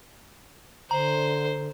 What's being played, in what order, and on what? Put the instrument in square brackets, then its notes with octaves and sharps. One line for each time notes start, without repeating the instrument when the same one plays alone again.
[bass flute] D3 [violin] C5 [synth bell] A#5